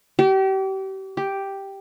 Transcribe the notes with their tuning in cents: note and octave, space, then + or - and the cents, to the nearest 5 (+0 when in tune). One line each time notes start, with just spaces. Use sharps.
G4 -35
G4 +0